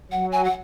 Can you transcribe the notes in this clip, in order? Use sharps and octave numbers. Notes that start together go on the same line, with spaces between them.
F#3 F#5
G#5
F#5